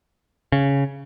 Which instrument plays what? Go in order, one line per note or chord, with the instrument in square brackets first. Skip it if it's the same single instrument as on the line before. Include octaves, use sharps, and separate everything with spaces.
[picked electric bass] C#3